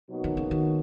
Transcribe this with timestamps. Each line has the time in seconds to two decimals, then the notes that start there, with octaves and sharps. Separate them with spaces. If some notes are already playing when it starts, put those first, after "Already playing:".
0.10 B2 F#3 A#3 D#4 F#4
0.24 D#3
0.37 C#3
0.51 D#3